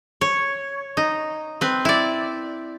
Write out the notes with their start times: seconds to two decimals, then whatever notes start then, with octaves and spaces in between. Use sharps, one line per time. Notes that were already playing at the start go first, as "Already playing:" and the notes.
0.21 C#5
0.97 D#4
1.61 C4 B4
1.85 E4 D5